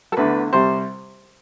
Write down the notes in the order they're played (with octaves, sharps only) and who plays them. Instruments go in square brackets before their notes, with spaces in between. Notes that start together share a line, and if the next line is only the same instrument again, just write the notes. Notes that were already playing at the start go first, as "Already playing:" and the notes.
[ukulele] A4
[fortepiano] E2 D3 A3 [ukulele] B4
[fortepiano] C2 C3 G3 [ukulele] C5